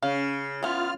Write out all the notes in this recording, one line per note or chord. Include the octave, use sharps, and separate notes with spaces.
C#3 F5
E3 B3 F4 F6